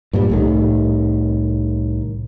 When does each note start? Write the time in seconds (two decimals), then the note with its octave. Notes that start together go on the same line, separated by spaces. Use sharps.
0.13 G2 A#2 G3
0.30 C2 A2 D#3